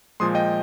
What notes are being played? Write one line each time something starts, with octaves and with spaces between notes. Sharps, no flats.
A#2 F3 G#3 C6 D#6
D#5 G5